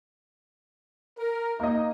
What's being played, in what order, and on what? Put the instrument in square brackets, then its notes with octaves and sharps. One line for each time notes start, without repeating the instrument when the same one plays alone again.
[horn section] A#4
[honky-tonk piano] A#3 D#5 [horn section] D#4